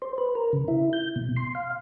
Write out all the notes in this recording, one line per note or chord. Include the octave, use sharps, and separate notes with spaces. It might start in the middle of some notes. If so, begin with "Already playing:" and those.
C5
B4
A#4
C#3
E4
G6
B2
C6
F5